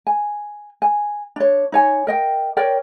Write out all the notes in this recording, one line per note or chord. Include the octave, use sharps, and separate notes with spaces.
G#5
G#5
D4 C#5
D#4 C#5 G#5
A#4 D#5 G5
A#4 C#5 D5 G5